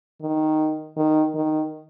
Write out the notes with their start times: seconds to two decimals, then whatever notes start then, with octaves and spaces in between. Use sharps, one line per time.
0.21 D#3
0.97 D#3
1.35 D#3